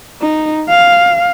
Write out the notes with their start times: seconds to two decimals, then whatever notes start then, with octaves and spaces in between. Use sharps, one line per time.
0.21 D#4
0.69 F5